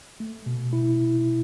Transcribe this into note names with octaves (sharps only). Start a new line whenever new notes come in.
A3
B2
E4